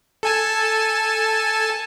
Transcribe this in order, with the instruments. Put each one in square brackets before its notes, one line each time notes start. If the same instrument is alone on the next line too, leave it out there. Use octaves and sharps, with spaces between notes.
[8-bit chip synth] A4 G#5 A5